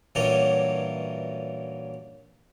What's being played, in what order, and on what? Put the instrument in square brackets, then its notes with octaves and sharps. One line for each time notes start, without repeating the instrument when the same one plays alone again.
[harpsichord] G2 A#2 E3 F#3 C#4 C#5